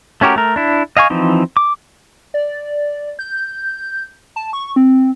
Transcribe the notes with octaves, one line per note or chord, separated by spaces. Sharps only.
A3 C#4 F#4 G4 A#4
A3 A#4
D4 E4
D#5 F5 G#5 C#6
E3 F3 C4 D#4
D6
D5
G6
A5
C#6
C4